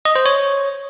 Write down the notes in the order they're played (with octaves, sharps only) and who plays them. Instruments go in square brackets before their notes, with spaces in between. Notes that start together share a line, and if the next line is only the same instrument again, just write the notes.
[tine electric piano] D#5
C5
C#5